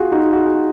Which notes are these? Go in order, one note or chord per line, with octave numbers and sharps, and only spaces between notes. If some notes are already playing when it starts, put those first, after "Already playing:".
Already playing: F4 F#4 G#4
D#4 F#4
F#4
G#4